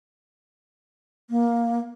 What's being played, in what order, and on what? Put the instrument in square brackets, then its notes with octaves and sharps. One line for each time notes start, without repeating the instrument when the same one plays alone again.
[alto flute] A#3